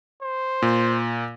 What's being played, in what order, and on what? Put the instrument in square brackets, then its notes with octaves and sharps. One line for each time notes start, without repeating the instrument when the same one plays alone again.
[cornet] C5
[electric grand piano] A#2